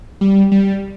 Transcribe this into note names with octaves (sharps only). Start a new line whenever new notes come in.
G3
G3